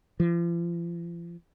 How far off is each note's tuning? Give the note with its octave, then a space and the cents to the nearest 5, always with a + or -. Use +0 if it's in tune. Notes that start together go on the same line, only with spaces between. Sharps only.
F3 -40